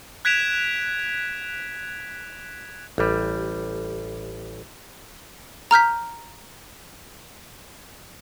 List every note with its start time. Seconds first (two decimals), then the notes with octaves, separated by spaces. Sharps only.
0.25 F#6 G#6 B6 D7 E7 F7
2.98 A1 G3
5.71 A#5 F6 G6 B6